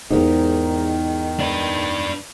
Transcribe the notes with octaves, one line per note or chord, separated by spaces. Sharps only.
E2 G#2 D#3 D#4 G4 A#4
D4 B4